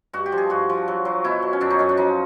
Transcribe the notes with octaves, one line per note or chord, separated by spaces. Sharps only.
G2 F#4
G4
F3
G#4
G2 F#4
F3
F#3
F#3
B2 E4
F#3
C#4
F#2 D4
D#4
F#2 C#4
D4
F3 D#4